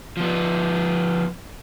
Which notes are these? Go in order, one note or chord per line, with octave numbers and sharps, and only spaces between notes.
F3 B3